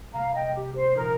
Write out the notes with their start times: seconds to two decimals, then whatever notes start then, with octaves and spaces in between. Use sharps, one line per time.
0.13 C3 G3 A#3 F5 A#5
0.34 D#5 G5
0.54 G4
0.74 C5
0.95 A#2 F3 D#4 A#4 C5